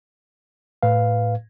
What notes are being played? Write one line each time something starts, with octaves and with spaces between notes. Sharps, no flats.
A2 B4 F5